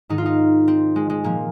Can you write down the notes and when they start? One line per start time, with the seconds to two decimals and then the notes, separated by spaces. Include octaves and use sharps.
0.09 G#2 D#3 D#4
0.18 F4
0.26 D#4
0.68 C4
0.96 G#3
1.10 G#3
1.24 A#2 F3 A#3